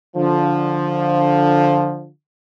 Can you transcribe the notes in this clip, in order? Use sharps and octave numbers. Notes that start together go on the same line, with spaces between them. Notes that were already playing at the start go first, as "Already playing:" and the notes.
D3 F3